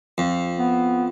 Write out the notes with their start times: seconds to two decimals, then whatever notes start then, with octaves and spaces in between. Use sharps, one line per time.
0.18 F2
0.59 B3